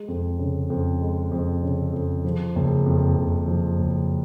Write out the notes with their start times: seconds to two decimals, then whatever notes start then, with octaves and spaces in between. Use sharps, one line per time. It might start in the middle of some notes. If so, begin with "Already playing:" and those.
Already playing: G#3
0.08 F2
0.39 C#3
0.70 F2
1.01 G#3
1.31 F2
1.62 C#3
1.93 F2
2.25 F3
2.56 F#1
2.86 F2
3.17 F#1
3.48 F3
3.78 F#1